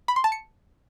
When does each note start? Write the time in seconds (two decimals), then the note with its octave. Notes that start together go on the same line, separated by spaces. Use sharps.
0.08 B5
0.16 C6
0.24 A5
0.32 C#7